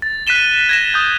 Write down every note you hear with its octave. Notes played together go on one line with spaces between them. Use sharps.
A6
F#6 B6 D#7 E7 G7
G#6 A#6 E7
D#6 G6